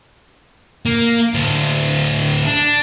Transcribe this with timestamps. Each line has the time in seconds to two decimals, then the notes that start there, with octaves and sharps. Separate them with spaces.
0.86 A#3
1.34 D2 A2
2.46 D4